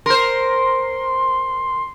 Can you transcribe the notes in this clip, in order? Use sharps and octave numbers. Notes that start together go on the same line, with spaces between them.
A#4 C5 C6